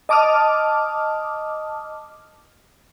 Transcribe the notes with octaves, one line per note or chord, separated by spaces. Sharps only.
D#5 A5 D6 D#6 F6